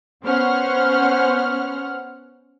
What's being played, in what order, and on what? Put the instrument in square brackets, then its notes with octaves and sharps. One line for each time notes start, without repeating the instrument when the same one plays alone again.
[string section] B3 C#4 C5 F#5 F6